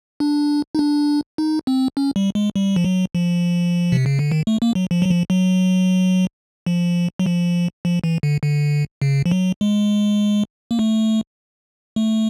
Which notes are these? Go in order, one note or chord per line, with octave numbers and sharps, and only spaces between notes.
D4
D#4
D4
D#4
C4
C#4
G3
G#3
G3
F3
F#3
F3
C3
C#3
D3
D#3
A3
A#3
F#3
F3
F#3
F3
F#3
F3
F#3
F3
F3
E3
D3
D3
C#3
F3
F#3
G#3
A#3
A3
A3